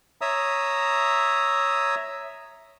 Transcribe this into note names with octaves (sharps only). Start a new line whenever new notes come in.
C#5 E5 A#5 D#6 E6